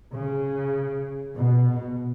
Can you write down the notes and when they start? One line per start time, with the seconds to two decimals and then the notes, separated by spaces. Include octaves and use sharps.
0.14 C#3
1.35 B2